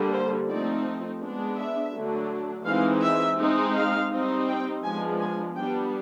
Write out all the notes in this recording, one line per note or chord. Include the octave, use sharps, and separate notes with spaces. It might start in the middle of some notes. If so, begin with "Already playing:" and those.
Already playing: D3 G3 A#3
C5
F3 A3 C4 D#4 D5
G#3 B3 D4
E5
D3 F#3 A3 D4
E3 G#3 C4 D#4 F5
E5
G#3 C4 D#4
F5
G3 C4 D#4
G5
F3 G#3 B3 D4 G#5
G#5
G3 B3 D4 G5